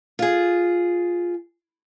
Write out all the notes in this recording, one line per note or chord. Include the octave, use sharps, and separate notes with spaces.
F4 G#4